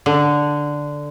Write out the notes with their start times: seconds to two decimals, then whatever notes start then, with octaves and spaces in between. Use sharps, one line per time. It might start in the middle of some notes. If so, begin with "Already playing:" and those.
0.06 D3